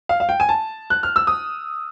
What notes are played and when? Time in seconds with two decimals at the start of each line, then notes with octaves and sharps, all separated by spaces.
0.09 F5
0.20 F5
0.29 G5
0.40 G#5
0.49 A5
0.90 F#6
1.03 F6
1.16 E6
1.27 D#6